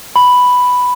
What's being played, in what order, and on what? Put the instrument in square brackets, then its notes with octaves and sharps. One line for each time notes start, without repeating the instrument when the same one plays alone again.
[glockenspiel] B5